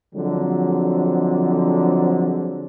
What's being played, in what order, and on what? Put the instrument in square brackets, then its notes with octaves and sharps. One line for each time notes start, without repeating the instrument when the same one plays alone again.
[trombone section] D3 F3 F#3 G#3 C4